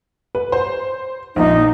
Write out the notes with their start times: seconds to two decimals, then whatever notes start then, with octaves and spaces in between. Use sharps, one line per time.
0.35 B4
0.52 C5
1.36 A#1 A#2 D#4